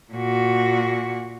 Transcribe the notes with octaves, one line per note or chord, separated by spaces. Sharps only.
A#2 F#4